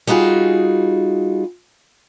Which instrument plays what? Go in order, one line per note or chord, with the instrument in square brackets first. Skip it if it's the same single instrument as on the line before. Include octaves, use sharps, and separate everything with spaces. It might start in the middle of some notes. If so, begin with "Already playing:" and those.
[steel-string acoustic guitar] G3 D#4 F4 F#4 G#4